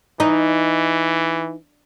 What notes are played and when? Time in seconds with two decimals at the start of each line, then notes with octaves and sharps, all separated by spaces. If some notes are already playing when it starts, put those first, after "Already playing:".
0.20 E3 D#4